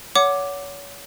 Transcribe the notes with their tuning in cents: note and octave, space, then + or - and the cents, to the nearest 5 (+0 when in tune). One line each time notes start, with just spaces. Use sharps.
C#5 +30 F#5 +0 D6 +0